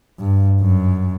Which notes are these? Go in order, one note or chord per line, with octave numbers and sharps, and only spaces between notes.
G2
F#2